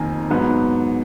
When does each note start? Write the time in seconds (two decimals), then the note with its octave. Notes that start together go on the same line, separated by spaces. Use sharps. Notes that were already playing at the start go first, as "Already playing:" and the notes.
Already playing: F2 D#3 A#3 G#5 A#5
0.30 G#2 F#3 B3